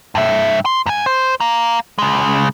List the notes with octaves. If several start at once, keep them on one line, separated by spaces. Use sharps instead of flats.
G2 E5
C6
F#2 G#5
C5
F5 A#5
C#3 G#3